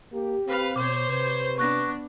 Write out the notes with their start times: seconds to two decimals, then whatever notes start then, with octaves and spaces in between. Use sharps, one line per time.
0.12 A#3 G4
0.47 C4 B4 F5
0.76 B2 C5 C#5 D6
1.08 C3 B4
1.58 B3 D4 C#6 F#6 A#6